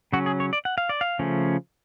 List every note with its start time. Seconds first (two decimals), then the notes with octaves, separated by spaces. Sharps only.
0.13 C#3 F#3 C#4 F#4
0.26 G#4
0.40 C#5
0.53 D5
0.65 F#5
0.78 F5
0.89 D5
1.01 F5
1.19 C#3 F3 A3 C#4